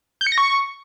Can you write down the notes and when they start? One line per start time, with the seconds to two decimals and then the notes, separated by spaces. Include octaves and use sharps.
0.21 G6
0.27 C#7
0.32 A#6
0.38 C#6